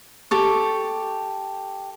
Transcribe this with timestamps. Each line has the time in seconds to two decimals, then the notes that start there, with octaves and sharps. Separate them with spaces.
0.31 G4 A4 C#6